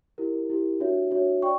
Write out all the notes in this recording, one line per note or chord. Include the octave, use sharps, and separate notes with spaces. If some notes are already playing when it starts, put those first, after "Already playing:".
E4 G4 A#4
E4 G4 A#4
D4 F#4 C#5 E5
D4 F#4 C#5 E5
D5 G5 C#6